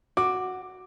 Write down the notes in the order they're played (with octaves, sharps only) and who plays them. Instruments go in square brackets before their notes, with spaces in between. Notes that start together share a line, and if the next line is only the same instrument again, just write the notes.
[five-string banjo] F#4 [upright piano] D6